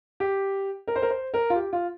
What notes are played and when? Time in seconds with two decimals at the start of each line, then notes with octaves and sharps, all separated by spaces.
0.20 G4
0.88 A#4
0.96 C5
1.02 A#4
1.10 C5
1.34 A#4
1.50 F4
1.56 G4
1.73 F4